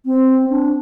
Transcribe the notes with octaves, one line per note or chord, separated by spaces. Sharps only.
C4
D4